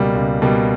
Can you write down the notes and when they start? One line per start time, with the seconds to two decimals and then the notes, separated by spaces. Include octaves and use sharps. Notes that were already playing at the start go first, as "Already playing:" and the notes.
Already playing: C#2 B2 G3 A#3
0.15 C#2
0.42 B2 G3 A#3